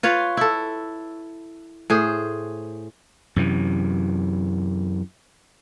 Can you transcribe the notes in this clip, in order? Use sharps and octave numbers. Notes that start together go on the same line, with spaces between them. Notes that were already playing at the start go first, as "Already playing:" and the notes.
F4 B4 C#5 F5
E4 A4
A2 G#4 C5
F#2 C3 E3